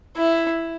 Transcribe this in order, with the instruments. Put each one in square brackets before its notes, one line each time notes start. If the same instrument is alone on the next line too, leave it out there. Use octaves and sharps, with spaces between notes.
[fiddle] E4